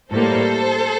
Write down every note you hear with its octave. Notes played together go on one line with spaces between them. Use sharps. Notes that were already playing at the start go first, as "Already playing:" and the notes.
A2 G3 A#3 A4 C5